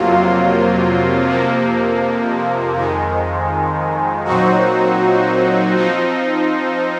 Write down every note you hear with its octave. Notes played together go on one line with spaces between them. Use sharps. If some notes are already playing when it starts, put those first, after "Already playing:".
Already playing: F2 C3 F#3 A#3 F4
F2 C3 F3 A#3
F2 D#3 G#3
A#2 F#3 C4 D#4 F#4
F3 C4 D#4